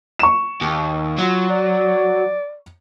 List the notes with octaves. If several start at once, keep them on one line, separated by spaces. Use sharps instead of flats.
C#6 E7
D#2
F#3 F4
D5